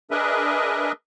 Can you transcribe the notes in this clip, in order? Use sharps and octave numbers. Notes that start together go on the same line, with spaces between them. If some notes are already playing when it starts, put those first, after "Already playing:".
D4 G#4 A#4 B4 D#5 E5